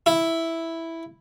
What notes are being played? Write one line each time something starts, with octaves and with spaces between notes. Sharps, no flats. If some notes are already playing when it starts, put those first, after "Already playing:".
E4